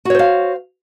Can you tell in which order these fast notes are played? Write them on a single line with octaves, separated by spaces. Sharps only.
F#4 C#5 C5 F5